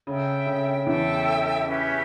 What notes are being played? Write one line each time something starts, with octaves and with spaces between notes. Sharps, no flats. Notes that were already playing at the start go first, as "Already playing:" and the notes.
C#3 A4 E5 G5
C#3
E2 E3 A4 E5 G5
C#4 G4 B4 E5